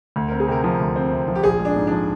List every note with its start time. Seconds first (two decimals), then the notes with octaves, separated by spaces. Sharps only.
0.16 D2
0.28 C4 A#4
0.40 G#4
0.48 C3 A#4
0.64 F3
0.80 D2
0.96 C4
1.12 C3
1.28 F3
1.35 G4
1.43 A#1 G#4
1.60 G#3
1.65 D4
1.76 G#2
1.87 F3 D4